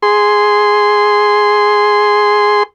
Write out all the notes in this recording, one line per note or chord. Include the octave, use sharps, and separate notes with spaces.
G#4 C6